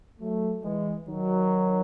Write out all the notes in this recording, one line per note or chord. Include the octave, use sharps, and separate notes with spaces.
F#3 A3
E3 G#3
D#3 F#3